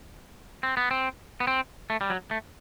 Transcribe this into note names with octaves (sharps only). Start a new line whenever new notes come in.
C4
B3
C4
B3
C4
A3
G3
F#3
A3